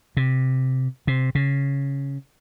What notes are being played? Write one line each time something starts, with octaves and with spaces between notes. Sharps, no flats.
C3
C3
C#3